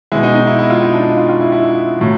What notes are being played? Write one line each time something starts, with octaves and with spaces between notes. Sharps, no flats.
B2 G#3 E4
D#4
D#4
E4
E4
F4
D#4
D4
D#4
F4
F4
E4
E4
A2 F#3